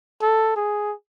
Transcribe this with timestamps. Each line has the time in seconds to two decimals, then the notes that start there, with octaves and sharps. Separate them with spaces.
0.22 A4
0.56 G#4